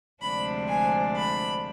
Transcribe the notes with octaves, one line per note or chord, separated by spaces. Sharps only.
D2 C3 F3 G#3 D4 B5
G#5
B5